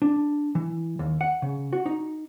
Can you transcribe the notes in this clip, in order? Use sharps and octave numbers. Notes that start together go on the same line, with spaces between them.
D4
E3
D#2
F#5
C#3
F#4
D#4